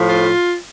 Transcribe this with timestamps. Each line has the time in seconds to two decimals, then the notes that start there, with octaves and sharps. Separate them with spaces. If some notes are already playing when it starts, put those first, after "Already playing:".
Already playing: A2 F3
0.09 F4